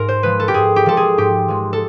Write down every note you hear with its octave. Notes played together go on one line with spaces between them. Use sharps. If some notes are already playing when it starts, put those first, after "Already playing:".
Already playing: G#2 A#4
C5
F3 G#3 B4
A4
G4
G#2 G#4
G4
F3 G#3 A4
G#4
G#2 G4
F3 G#3
A4